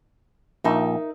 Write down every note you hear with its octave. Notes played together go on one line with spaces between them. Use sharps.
A#1 D#4 A#4 E5